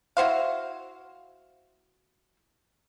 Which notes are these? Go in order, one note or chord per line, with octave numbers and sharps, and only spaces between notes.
E4 F#4 C5 F5